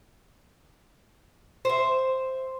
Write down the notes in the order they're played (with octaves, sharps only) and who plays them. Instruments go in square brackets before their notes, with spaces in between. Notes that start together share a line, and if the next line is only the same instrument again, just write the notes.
[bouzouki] C5 E5